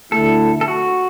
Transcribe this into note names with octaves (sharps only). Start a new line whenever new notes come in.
D2 D3 A3 E4 A4
A4
F#4